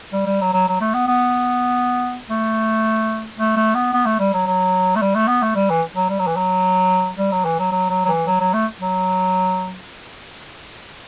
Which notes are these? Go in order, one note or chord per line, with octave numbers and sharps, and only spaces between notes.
G3
G3
F#3
F#3
F#3
A3
B3
B3
A3
A3
A3
B3
B3
A3
G3
F#3
F#3
A3
G3
A3
B3
A3
G3
E3
F#3
G3
F#3
E3
F#3
G3
F#3
E3
F#3
F#3
F#3
F#3
E3
F#3
F#3
A3
F#3